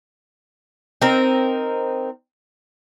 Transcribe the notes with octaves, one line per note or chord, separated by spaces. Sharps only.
C4 D#4 A#4